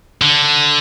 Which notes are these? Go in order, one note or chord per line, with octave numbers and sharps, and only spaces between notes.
D3